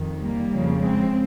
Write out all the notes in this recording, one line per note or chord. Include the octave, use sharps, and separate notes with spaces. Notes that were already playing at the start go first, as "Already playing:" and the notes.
Already playing: F2 D#3
G3 A#3
F2 C#3 F3
G#3 C4